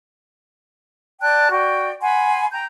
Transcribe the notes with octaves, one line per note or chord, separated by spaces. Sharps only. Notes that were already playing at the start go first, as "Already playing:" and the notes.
D5 G5 A5 F#6
F#4 D5 G5
F#5 G#5 B5 C6
G5 A#5 G6